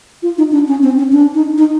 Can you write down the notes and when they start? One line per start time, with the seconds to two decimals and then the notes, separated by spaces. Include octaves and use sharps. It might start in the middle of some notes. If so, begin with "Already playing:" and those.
0.23 F4
0.38 D#4
0.52 D4
0.68 C#4
0.83 C4
0.98 C#4
1.12 D4
1.35 D#4
1.58 D#4